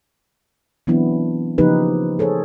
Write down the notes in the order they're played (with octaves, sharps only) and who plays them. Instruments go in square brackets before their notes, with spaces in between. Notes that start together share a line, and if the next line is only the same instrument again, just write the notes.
[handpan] E3 F#3 B3 C4 D4 E4
C#3 F3 A#3 D#4 G4 B4
G#4 A4 C5 C#5